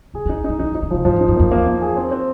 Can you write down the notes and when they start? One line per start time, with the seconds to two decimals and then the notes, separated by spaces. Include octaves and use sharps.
0.14 C3 G#4
0.26 D3
0.29 D#4
0.44 E3 D#4
0.59 D#3 D#4
0.71 D3
0.75 D#4
0.83 D3
0.91 C3 F3
1.05 G#2 F3
1.16 G2
1.21 D#4
1.28 F#2
1.36 F2 A#3
1.51 E2 A#3
1.67 A#3
1.82 G#4
1.96 C4
2.12 C4